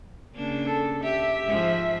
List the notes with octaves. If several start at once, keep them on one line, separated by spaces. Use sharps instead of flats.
C#3 A#3 D4
A4
G4 E5
G#2 F3